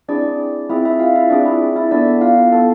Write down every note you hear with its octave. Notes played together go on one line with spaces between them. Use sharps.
C4 D4 E4 G#4 D5
C4 E4 F4 G#4 E5
E4 E5
F4 F5
E4 E5
C4 D4 F4 G#4 D5
E4 E5
E4 E5
B3 D4 E4 A4 D5
F4 F5
B3 E4 A4 A5